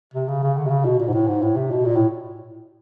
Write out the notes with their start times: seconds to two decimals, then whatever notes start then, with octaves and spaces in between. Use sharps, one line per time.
0.14 C3
0.28 C#3
0.43 C#3
0.57 D3
0.66 C3
0.71 C#3
0.85 B2
1.00 A#2
1.08 G#2
1.14 A2
1.28 G#2
1.42 A2
1.57 C3
1.71 B2
1.85 A#2
1.96 A2